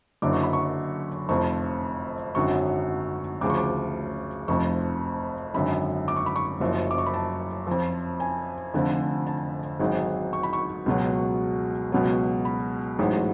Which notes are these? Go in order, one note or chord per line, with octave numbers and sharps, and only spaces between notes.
F#1 F#2 D3 D6
C#6
B5
C#6
F1 F2 F3 C#6
G#1 F#2 D3 F#3 C#6
D2 C#3 F3 D6
C#6
D6
F1 F2 F3 C#6
G#1 F#2 D3 B5
D6
C#6
B5
C#6
F#1 F#2 F3
D6
C#6
B5
A5
F2 F3
G#5
F1 F2 D3 F3
A5
G#1 G#2 F#3
C#6
B5
C#6
C#2 B2 F#3
C#2 B2 F#3
B5
A1 G#2 F#3